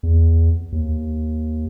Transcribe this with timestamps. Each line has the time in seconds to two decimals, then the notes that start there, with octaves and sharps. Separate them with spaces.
0.03 E2
0.72 D#2